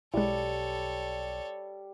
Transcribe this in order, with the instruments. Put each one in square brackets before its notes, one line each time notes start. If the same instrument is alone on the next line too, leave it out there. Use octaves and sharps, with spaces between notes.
[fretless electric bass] B1 [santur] G3 [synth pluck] G#3 E4 [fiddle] A4 C#5